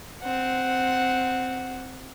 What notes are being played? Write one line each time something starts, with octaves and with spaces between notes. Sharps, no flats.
C4 F#5